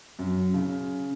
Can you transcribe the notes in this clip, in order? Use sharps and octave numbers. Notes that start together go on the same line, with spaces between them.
F#2
C#3